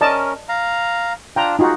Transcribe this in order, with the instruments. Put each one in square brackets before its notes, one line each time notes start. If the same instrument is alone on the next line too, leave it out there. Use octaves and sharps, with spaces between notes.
[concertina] C#4 A#4 [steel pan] D5 D#5 A5
[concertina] F5 A#5
[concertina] D4 F4 [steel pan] G5 A#5
[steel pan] D#4 F4 F#4 [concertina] G#4